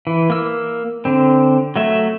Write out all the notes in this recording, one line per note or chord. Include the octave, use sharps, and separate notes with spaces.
E3
A#3 E6
D3 C4
F#3 A3 E5